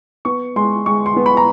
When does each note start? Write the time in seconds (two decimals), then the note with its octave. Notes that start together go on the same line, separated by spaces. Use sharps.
0.25 B3 C#6
0.56 G#3 C6
0.86 G#3 C#6
1.06 C6
1.16 B3
1.26 B5
1.37 A#5